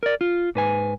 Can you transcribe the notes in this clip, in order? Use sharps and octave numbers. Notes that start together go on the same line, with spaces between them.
A#4 D5
F4
G#2 B4 G#5